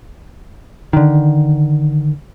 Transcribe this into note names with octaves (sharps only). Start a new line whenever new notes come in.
D3 D#3